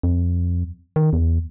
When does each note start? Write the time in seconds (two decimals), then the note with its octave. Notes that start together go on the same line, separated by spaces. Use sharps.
0.03 F2
0.96 D#3
1.13 E2